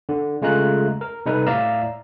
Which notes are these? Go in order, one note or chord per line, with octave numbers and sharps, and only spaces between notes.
D3
C#3 G#3 A3 F4 A#5 F#6
A#4
C3 G3 D#4 A4 B4
A2 D5 E5 F5 A#5 E6